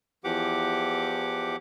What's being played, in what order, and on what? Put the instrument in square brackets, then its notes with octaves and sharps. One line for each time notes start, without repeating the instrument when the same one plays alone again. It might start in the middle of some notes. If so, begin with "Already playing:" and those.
[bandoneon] E2 E3 F3 G4 F#5 D6